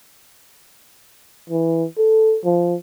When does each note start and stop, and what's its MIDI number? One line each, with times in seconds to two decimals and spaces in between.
1.49 1.85 52
1.97 2.38 69
2.44 2.75 53